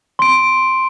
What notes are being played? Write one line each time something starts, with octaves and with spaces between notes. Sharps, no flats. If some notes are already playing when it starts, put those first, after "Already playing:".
C6 D7